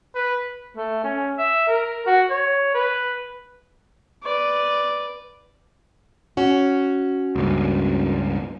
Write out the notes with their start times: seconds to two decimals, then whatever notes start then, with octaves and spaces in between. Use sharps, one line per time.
0.15 B4
0.77 A3
1.04 C#4
1.38 E5
1.68 A#4
2.06 F#4
2.30 C#5
2.74 B4
4.23 B4 D5
6.37 C#4 F#4
7.36 C#2 G2